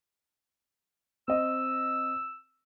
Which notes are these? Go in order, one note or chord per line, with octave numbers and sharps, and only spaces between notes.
C4 D#5 E6